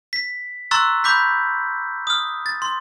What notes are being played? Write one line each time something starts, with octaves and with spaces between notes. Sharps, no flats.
B6
A#5 C6 C#6 E6 F#6 A6
B5 D6 G6 B6
D#6 F6
A6
C6